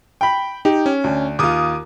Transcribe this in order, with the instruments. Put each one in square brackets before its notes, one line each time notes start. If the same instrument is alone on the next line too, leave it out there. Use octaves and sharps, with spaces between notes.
[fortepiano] G5 B5
[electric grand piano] D#4 [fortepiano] G4
[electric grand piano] C#4
[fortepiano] D2
[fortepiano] D#2 F4 [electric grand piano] D6 D#6